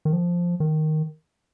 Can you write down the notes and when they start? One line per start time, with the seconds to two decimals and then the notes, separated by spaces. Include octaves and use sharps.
0.05 D#3
0.13 F3
0.60 D#3